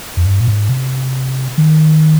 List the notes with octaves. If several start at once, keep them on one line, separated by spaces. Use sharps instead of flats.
F2
G2
A#2
G#2
C3
D#3